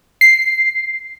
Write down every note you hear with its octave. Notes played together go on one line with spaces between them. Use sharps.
C7